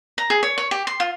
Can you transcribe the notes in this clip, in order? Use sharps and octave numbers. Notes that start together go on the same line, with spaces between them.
A#5
G#4
C#5
C#5
G4
C6
F4